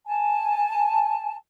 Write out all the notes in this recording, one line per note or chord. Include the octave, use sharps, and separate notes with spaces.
G#5 A5